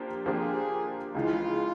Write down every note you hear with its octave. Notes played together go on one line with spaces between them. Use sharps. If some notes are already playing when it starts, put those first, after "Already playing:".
Already playing: F3 A#3 D4 G4
F3 A#3 D4 G4 G#4
C#2 C#3 E3 F4